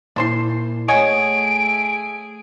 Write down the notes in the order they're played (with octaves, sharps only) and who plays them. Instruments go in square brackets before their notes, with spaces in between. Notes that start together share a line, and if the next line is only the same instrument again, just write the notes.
[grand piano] A#2 E4 [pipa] D4 C5 C6
[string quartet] A3 G#4 [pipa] C#5 D#5 G#5 [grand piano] F#5 [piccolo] D7